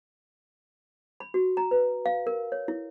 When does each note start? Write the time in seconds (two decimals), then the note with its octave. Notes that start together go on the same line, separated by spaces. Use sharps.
1.20 B5
1.34 F#4
1.57 A#5
1.71 B4
2.06 F5
2.27 A#4
2.52 C#5
2.68 E4